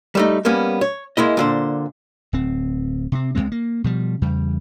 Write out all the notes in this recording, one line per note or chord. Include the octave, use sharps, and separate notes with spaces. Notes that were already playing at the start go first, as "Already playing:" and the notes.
G3 A3 D#4
G3 A#3 B3 C#4
C#5
G#3 A#3 E4 D#5
A#2 D3 C5
D1 C4
C3 C4
C#2 G2 G#3 C4
A#3
B2 F3 G3
E2 C#3 G3